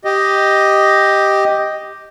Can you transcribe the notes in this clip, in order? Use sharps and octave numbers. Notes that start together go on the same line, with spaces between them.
G4 D#5